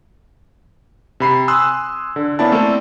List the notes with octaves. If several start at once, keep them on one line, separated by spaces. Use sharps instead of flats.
C3 B5 C7
G#5 C6 D#6 E6 F#6
D3
A#3 B3 C#4 E4 D5 A5
A3 C4 A4 D5